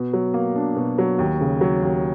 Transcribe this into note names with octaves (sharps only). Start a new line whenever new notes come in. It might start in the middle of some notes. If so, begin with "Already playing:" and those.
Already playing: B2
F#3
A#3
D4
B2
F#3
D#2
C#3
F#3
D#2